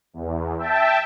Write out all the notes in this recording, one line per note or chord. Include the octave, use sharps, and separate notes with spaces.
E2
E5 G5 A5